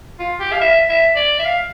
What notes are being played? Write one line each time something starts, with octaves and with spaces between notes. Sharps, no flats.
F4
G4
F5
E5
E5
D5
E5
F5